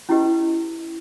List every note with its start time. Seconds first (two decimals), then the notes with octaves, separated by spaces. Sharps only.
0.09 C#4 E4 G4 B4 D#5